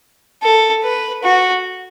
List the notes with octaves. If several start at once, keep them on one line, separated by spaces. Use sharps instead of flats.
A4
B4
F#4